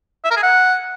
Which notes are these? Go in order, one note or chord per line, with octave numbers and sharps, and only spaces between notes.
E5
A#4
G#4
F#5